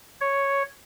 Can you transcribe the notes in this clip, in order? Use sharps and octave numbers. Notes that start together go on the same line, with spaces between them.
C#5